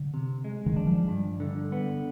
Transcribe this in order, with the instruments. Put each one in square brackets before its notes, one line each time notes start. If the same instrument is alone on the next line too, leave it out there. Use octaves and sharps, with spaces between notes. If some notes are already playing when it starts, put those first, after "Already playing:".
Already playing: [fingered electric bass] D3
[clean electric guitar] C3
G#3
[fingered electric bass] D#3
[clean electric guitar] D4
[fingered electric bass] F3
[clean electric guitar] G2
D3
B3